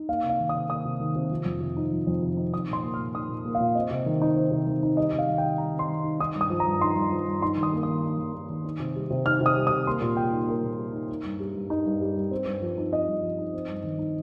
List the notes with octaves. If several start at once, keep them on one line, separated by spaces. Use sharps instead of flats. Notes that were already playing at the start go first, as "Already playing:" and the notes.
Already playing: D#4
A#3 F5
C3
F5
D#3
C3 D#6
A#3 D#6
C3
D#3
C3
F3
F2
C3
D#4
F3
F2
C3
D#4
D#4 D#6
A#2 C6
A#3
A#2 F6
D#4 D#6
A#2
A#3
F5
A#2
C4 D#5
C3
D#3
D#4
C4
C3
D#3
D#4
G3 D#5
C3
F5
D#3
G5
D#4
G3 A#5
C3
C6
D#3
D#4
D#4 D#6
G2
D#6
F3
A#5
G2
D#4 C6
G2
F3
G2
D#4 C6
D#3
D#6
A#3
D#3 D#6
D#4
D#3
A#3
D#3
D#4
C3
G3
C3
D#4 F6
C3
D#6
G3
C3 D#6
A#3 C6
A#2
G3 G5
D#4
A#3 A#4
A#2
G3
D#4
D#4
G2
G3
G2
D#4
G2
G3
G2
C4
G2
F3
D#4
C4 D#5
G2
F3
D#4
C4
G2
D#3
D#4